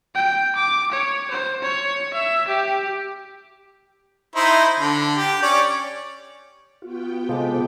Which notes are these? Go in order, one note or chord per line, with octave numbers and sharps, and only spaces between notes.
G5
D6
C#5
C5
C#5
E5
G4
D#4 E4 C5
D3
G4
C#4 C#5 D5
B3 F4 F#4 G5
C3 F3 G#3 A4 C5 D6